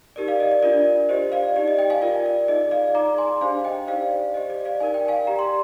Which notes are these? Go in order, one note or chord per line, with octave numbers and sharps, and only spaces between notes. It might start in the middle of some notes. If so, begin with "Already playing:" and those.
D#4 G4 A#4 D5
D5 F5
D#5
D5
D4 F4 A#4 D5
G4 C5 D#5
D5 F5
D#4 G4 D5
D#5
D#5 G5
F5 G#5
F4 A#4 D5
D5
D#4 G#4 D5 D#5
D5 F5
D#4 G#4 D5 A#5 D6
G#5 C6
D4 G4 C5 F5 G#5
D#5 G5
D#4 G4 C5 D5 F5
G4 C5 D#5
D5
D5 F5
D#4 A#4 D5 G#5
G5
F5 G#5
G4 D5 A#5
C6